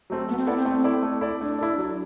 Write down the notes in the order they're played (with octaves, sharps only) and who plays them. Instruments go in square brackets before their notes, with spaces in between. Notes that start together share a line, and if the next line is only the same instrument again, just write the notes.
[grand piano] F#3 A3 C4
[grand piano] A3 [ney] B3
[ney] C4
[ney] B3 [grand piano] E4 A4 D5
[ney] C4
[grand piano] A3
E4 A4 D5
A3
E4 A4 D5
[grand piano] A3 [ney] D4
[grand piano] E4 A4 D5
F#3